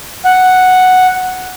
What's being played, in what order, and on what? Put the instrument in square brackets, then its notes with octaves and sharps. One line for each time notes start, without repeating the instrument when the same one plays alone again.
[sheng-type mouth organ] F#5